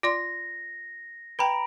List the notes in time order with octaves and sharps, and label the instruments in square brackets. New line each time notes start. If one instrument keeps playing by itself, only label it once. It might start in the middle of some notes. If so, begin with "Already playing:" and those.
[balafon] F4 D5 C6 [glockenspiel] A#6
[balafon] B4 G5 [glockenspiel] A#5 B5 D7